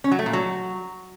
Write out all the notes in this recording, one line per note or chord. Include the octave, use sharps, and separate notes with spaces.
C#4
F#3
A3
A#2
F#3